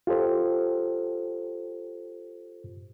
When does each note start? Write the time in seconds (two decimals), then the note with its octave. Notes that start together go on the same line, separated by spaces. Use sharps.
0.07 F4 G4 A4 C5